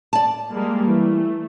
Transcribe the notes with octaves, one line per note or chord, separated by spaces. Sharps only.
D5 A5
G3 G#3 A#3
E3 A3